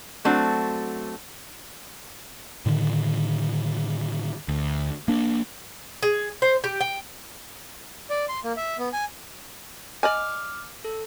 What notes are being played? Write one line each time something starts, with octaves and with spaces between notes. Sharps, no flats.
F#3 A3 C4 D4 F#4
A2 D3 D#3
D2
A#3 D4
G#4
C5
G4
G5
D5
C6
A#3
E5
B3
G#5
D5 D#5 G#5 D6 F6
A4